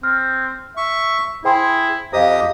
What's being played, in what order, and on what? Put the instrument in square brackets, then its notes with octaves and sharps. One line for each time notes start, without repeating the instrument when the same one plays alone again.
[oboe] C4 [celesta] F6
[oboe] E5 [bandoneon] C#6
[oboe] E4 [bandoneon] G#4 [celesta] C5 G5 C6
[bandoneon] F2 G4 D#6 [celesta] C5 D#5 F5 [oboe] A#5